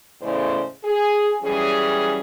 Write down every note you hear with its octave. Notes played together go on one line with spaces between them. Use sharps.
E2 A2 C#3 G#3 C5 D5
G#4
E3 F#3 G3 C#4 G#4